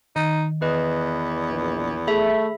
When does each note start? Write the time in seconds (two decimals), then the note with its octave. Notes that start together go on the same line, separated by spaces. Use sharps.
0.16 D#3 D#4
0.62 E2 B4 D#5
1.50 A#1
2.08 A3 G#4 E5 B5